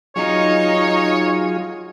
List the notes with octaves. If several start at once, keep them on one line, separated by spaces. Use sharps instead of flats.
F#3 D#4 F4 G#4 C#5